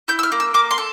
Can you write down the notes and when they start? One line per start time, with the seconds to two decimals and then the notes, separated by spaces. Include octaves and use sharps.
0.08 E4 G6
0.19 E6
0.23 F6
0.32 A#3
0.40 E6
0.54 A#3 D6
0.71 C6
0.78 A4